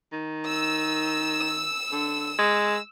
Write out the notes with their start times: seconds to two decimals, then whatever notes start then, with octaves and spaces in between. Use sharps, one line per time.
0.12 D#3
0.47 E6
1.92 D3
2.38 G#3